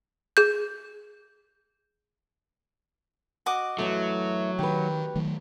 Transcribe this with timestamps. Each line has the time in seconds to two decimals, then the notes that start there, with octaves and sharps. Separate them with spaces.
0.37 G#4 G6
3.46 F#4 D#5 D6
3.79 F#2 E3 F#3 A3
4.59 D#3 G4 B4
5.16 D#3 F#3 A3